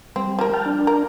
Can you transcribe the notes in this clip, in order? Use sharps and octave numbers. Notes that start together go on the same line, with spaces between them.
G3 C4
F3 A#4
G5 A5 F6
D4
A#4